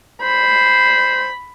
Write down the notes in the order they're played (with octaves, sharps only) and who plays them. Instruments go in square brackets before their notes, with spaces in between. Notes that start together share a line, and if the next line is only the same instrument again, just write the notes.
[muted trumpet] C5 [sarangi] B5